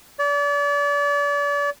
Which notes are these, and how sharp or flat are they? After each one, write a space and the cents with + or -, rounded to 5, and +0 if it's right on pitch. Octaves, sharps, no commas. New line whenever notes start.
D5 -35